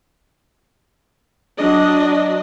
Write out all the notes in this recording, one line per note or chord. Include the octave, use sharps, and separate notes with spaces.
F#3 D4 D#5